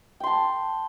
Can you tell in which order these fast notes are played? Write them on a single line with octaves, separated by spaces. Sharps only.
G5 C6 A5